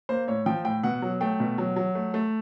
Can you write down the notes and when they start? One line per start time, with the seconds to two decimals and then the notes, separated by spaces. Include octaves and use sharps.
0.09 A#3 C5
0.28 A2 C#5
0.46 F3 G5
0.65 A2 G5
0.83 B2 F#5
1.02 F#3
1.21 A3 G5
1.40 B2
1.58 F#3
1.76 F#3
1.95 A3
2.14 A3